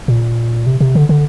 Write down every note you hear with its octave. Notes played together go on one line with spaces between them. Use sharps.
A#2
C3
C3
D3
D3